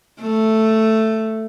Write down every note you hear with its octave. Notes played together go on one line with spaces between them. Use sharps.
A3